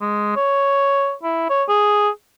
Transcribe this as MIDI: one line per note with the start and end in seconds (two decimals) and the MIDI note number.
0.01 0.35 56
0.36 1.13 73
1.23 1.47 64
1.49 1.63 73
1.69 2.09 68